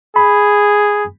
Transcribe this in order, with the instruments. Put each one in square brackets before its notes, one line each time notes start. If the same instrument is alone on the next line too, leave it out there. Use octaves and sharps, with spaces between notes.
[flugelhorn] G#4 [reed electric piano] B5